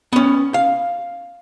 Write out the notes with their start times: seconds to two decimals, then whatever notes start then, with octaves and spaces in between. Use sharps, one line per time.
0.12 B3 C#4
0.54 F5